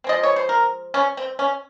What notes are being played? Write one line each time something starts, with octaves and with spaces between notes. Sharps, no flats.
F3 G#3 C4 D#5
C#5
C5
A#4
C#4
C4
C#4